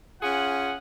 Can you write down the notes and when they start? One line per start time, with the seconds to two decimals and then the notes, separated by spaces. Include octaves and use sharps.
0.22 C#4 F4 G#4 F#5